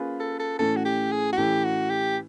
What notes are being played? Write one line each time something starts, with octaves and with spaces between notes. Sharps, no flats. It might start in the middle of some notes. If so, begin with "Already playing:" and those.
Already playing: A#3 C#4 F4 G#4 B4
A4
A4
A2 E3 A3 C#4 A4
F#4
G4
G#4
F#4
A2 E3 A3 C#4 G4
F#4
G4